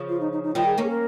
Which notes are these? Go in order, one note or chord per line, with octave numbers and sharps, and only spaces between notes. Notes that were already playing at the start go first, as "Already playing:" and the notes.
Already playing: C#3 F3
F4
D#4
D#4
D#4
D#3 G3 F4
G#4
A#3 C#4 A#4
G#4
A#4